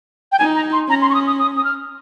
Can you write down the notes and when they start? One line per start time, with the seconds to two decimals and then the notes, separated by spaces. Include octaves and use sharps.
0.32 G5
0.39 D#4 G#5
0.55 A#5
0.72 C6
0.88 C#4 A#5
1.02 C6
1.10 C#6
1.14 D#6
1.27 D#6
1.39 D#6
1.57 D#6
1.64 F6